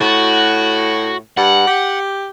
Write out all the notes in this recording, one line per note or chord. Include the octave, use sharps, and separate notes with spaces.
A2 F#4
G2 F#5
G4